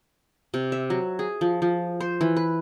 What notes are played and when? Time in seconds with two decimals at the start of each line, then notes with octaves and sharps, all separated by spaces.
0.54 C3
0.72 E5
0.90 F#3
1.19 G#4
1.41 F3
1.62 F3
2.00 C5
2.21 E3
2.36 B4